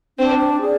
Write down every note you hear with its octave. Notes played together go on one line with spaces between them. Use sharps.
C4 D4
G#4 D5